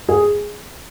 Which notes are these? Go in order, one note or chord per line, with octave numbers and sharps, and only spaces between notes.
G#4